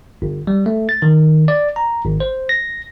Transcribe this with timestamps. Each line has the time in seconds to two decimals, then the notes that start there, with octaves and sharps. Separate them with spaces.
0.22 G1
0.47 G3
0.66 A3
0.89 A6
1.02 D#3
1.48 D5
1.76 A#5
2.05 G#1
2.20 C5
2.49 A#6